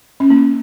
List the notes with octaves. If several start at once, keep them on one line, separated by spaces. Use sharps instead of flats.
C#4
A#3